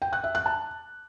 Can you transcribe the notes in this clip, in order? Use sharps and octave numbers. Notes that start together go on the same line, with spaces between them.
G5
F#6
E5
F#6
A5